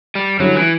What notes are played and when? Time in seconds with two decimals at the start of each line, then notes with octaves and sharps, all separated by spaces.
0.15 G3
0.39 D3 F#3 G3 C#4 E4
0.55 E3